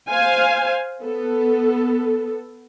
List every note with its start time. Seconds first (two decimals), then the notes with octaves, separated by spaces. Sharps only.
0.10 C5 F5 G#5
1.03 B3 A4